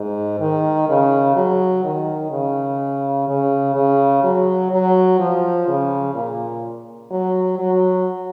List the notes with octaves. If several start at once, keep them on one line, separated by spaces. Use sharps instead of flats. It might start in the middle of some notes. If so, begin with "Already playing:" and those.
Already playing: G#2
D#3
C#3
F#3
D#3
C#3
C#3
C#3
F#3
F#3
F3
C#3
A#2
F#3
F#3